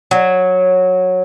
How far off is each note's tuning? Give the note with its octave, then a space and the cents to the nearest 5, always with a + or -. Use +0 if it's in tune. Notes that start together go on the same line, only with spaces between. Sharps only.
F#3 -10